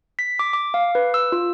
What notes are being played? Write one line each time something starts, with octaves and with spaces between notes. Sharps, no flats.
B6
D6
D6
F5
B4
E6
F4